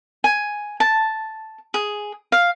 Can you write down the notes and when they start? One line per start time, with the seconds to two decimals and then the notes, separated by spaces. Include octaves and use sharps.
0.24 G#5
0.80 A5
1.74 G#4
2.32 F5